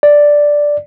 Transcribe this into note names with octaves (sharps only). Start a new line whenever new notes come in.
D5